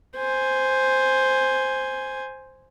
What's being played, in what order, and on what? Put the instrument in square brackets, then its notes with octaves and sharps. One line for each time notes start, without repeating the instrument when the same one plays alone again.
[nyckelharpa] C5 G#5